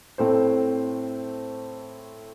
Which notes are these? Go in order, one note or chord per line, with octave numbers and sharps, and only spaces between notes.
A2 A3 C4 C5